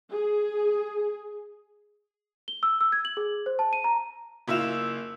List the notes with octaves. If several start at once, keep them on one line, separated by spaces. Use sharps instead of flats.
G#4
G7
E6
E6
G#6
F#7
G#4
C5
A5
D#7
A#5
F#1 E4 F4 E6 E7 F7